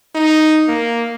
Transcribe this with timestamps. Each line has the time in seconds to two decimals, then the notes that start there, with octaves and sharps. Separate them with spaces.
0.15 D#4
0.68 A#3